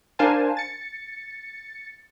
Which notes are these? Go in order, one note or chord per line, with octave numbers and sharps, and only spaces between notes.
D4 A#4 C5 F5 G#5 A5
A6 C#7